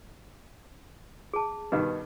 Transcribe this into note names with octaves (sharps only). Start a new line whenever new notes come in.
G#4 A5
G2 B2 D#3 B4